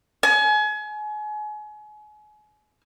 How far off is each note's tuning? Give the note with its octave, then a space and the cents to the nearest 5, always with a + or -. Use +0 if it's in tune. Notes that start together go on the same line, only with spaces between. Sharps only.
G#5 +35